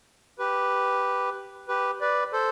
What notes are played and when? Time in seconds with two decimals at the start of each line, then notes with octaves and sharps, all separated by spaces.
0.39 G4 B4
1.68 G4 B4
2.01 B4 D5
2.33 A4 C5